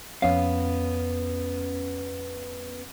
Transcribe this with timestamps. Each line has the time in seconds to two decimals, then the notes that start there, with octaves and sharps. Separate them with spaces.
0.22 F2 B3 C#4 F5